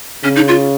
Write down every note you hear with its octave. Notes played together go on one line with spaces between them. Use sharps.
C#3 C#4
D#4
F4